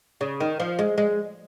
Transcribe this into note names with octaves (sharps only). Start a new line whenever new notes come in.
C#3
D#3
F3
G#3
G#3